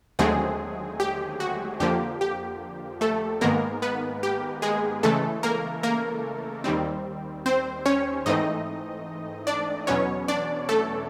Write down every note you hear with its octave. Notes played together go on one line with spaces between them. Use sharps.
D#2 D3 F#3 G#3 A3 C4 G#4
G4
F#4
F2 D3 F3 A#3 G4
G4
A3 A4
G#2 D#3 G#3 A#3 B3 A#4
B3 B4
G4
G#3 G#4
C#3 E3 G#3 A3 A4
A#3 A#4
A#3 A#4
D#2 D#3 G3 C4
C4 C5
C#4 C#5
G#2 E3 A3 C4 D#4 D#5
D4 D5
E2 B2 F#3 B3 C#4 C#5
D4 D5
A3 A4